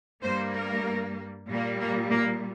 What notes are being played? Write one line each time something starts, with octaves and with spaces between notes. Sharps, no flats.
G2 G3 A#3 C5
A#4
A#2 G3 A#3
A#3
A#3